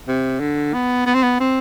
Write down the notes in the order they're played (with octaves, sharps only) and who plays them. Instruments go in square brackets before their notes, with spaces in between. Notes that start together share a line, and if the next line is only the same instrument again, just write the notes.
[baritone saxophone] C3
D3
B3
B3
C4
B3
C4